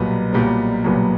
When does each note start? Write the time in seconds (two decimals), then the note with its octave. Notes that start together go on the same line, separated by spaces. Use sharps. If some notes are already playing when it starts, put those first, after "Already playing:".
Already playing: B1 A#2 G3 B3
0.33 B1 A#2 G3 B3
0.84 B1 A#2 G3 B3